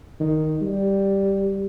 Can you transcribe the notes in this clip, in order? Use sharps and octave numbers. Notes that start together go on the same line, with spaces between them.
D#3
G3